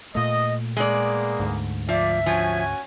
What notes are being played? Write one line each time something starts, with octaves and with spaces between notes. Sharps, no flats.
A#2 A3 D#5
G#3 A#3 B3 G#4 D5
D2 G#2
F3 D5 E5
F3 C#4 F#4 G#5